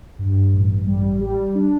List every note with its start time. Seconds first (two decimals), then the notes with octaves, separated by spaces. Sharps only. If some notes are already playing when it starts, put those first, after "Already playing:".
0.19 G2
0.53 A1
0.87 G3
1.21 G3
1.55 D4